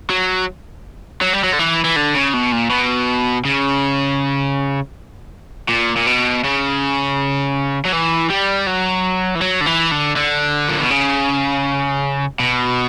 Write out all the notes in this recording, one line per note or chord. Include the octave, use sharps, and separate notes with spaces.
F#3
F#3
G3
F#3
D3
E3
E3
D3
C#3
B2
A#2
B2
C#3
A#2
A#2
B2
C#3
F#3
E3
G3
F#3
E3
F#3
D3
E3
D3
D3
A#2
B2
C#3
B2